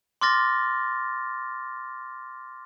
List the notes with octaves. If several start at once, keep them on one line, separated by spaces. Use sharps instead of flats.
C6 D6 F6 A6 A#6